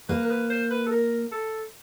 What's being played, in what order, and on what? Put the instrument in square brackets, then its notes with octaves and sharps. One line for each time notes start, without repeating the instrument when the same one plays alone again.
[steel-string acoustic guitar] A#3 [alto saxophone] B4
[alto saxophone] A#4
B4
C5
B4
A4
A#4
A4